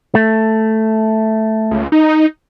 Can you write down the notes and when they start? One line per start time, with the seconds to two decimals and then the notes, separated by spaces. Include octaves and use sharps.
0.15 A3
1.71 C#2
1.92 D#4